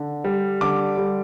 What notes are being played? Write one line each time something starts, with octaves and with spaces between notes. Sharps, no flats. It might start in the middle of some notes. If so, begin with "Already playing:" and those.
Already playing: D3
G3
D3 D6
G3